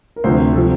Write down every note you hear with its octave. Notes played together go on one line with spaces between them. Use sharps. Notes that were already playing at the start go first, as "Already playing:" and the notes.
A#4
D2 C3 F3 C5
C3 F3 A4